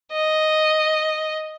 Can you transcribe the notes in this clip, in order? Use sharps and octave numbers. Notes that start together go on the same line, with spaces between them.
D#5